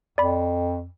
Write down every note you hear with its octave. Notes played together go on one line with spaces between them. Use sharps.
F2 D5 B5